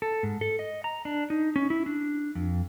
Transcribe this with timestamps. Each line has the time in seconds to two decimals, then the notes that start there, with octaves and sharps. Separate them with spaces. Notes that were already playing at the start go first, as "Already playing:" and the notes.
0.02 A4
0.23 G#2
0.41 A4
0.59 D#5
0.84 A#5
1.05 D4
1.30 D#4
1.56 C#4
1.70 E4
1.86 D4
2.35 F2